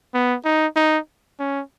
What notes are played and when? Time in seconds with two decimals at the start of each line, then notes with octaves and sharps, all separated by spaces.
0.14 B3
0.45 D#4
0.76 D#4
1.39 C#4